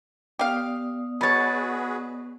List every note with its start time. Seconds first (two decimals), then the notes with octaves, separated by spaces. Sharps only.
0.39 B3 G4 D5 F5 D#6
1.21 B2 F#4 G#4 B4 C#5 B5 A6